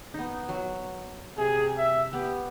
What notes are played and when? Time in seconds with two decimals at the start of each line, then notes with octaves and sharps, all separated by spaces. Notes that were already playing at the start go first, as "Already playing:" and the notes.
0.14 B3 D#4
0.49 F#3
1.38 C3 G#4
1.78 E5
2.13 B3 G4